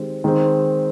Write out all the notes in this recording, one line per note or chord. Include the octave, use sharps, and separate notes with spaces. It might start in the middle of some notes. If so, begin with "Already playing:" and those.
Already playing: D#3 G#3 C4 G4
D#3 G#3 C4